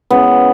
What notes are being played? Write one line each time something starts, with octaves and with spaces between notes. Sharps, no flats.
C#3 E3 G#3 B3